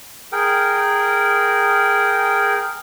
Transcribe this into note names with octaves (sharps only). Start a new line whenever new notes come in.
G#4 A#4 G5